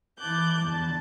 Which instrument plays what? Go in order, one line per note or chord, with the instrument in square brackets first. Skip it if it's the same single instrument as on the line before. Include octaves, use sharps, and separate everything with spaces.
[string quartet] E3 A5 D6 F#6 G6
E2 D3 A5